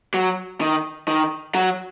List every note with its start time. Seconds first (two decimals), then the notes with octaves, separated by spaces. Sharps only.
0.14 F#3
0.61 D#3
1.08 D#3
1.55 F#3